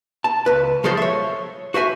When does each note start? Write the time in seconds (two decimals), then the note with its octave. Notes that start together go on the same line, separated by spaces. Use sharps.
0.24 A5
0.46 C#2 B4
0.84 C#3 F3 F#3 G#3 A4 C5
0.97 C#5 E5
1.74 F#4 C5 E5 G#5